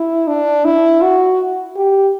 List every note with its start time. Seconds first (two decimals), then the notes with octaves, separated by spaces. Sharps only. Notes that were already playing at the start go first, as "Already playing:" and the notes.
Already playing: E4
0.28 D4
0.65 E4
1.02 F#4
1.76 G4